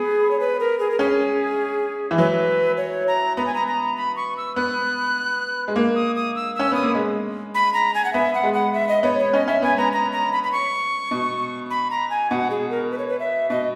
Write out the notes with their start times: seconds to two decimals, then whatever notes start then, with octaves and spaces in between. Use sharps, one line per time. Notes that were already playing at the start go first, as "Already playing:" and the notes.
Already playing: B3 G#4
0.31 C#5
0.40 B4
0.60 A#4
0.79 G#4
0.91 A#4
0.99 C#4 G#4
2.11 E3
2.18 F#3 B4
2.77 C#5
3.08 A#5
3.37 B3 A#5
3.46 G#5
3.54 A#5
3.67 A#5
3.97 B5
4.16 C#6
4.37 E6
4.56 B3 F#6
5.68 G#3
5.76 A#3
5.96 D#6
6.16 D#6
6.36 E6
6.55 C#4 E6
6.72 B3 D#6
6.83 A#3
6.95 G#3
7.55 B5
7.74 A#5
7.95 G#5
8.05 F#5
8.13 B3 E5
8.34 F#5
8.43 G#3
8.54 F#5
8.74 E5
8.89 D#5
9.03 B3 C#5
9.18 C#5
9.33 C#4 D#5
9.48 C#4 E5
9.62 B3 G#5
9.77 B3 A#5
9.93 A#5
10.12 A#5
10.32 B5
10.44 B5
10.52 C#6
11.11 B2
11.70 B5
11.90 A#5
12.10 G#5
12.30 B2 F#5
12.50 G#4
12.70 A#4
12.91 B4
12.98 C#5
13.08 B4
13.20 E5
13.50 B2 D#5